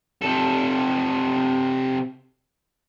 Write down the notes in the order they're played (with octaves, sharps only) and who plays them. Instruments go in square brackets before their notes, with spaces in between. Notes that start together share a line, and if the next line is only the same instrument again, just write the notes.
[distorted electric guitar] C3 A4